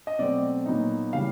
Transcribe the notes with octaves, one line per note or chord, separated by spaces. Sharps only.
D#5
B2 F#3 A3 C4 D5
A#2 F#3 B3 D#4
C#3 E3 G3 F5